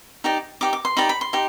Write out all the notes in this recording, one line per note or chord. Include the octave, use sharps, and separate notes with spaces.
D#4 G4 D5
D#4 G4 D5 D6
D6
C6
D#4 G4 D5 B5
B5
C6
D#4 G4